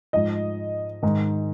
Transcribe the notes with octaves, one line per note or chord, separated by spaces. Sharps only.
G#2 F3 D#5
G#2 D#3